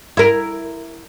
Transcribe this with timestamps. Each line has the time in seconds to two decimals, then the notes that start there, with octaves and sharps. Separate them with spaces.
0.17 E4 A#4